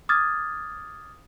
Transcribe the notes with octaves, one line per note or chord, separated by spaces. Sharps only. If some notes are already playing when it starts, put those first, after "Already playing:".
D6 D#6 F6 G#6 A6